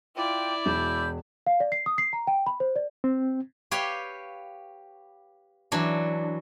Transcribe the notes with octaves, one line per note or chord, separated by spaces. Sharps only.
E4 F4 D5 G5
E1 B5 E6 G6
F5
D5
C7
D#6
C7
A#5
G5
B5
C5
D5
C4
G4 B4 C#5 F5 G5
E3 F#3 D4